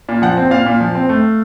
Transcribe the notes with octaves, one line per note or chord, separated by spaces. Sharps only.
A#2
F3 F#5
C4
A#2 F5
A#2
F3
C4
A3